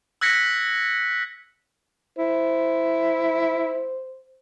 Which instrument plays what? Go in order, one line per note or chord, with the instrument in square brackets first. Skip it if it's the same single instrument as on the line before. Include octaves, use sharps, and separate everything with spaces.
[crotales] E6 F#6 G#6 A#6 B6 C#7
[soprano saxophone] E4 [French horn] C5